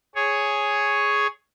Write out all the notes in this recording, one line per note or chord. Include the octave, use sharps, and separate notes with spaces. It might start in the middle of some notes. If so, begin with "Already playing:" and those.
G#4 C#5